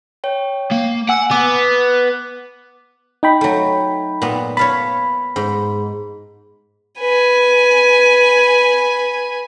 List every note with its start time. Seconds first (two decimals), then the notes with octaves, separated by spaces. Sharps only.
0.24 C#5 G5
0.72 A#3
1.09 F#5 G#5 E6
1.31 B3 D6
3.23 D#4 G5 B5
3.41 F#3 A3
4.22 A#2 B3
4.57 C#5 F5 A5 B5
5.36 G#2
6.99 B4 G#5